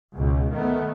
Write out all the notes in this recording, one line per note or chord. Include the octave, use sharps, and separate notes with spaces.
C#2 B2
D#3 A3 B3